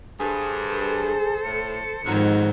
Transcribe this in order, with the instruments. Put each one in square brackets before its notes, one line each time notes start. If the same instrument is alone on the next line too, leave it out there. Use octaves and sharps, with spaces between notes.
[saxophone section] G2 [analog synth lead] G#4 [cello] A4 C5
[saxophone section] A2 [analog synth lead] C#7
[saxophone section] F2 F#3 [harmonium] G#2 [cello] D#3 F3